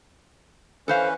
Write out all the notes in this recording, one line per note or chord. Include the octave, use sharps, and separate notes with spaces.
E3 C#4 A4 B4 C5 F5